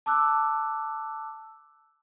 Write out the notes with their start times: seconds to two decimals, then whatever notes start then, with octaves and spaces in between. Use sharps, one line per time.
0.06 A5 D6 E6 F#6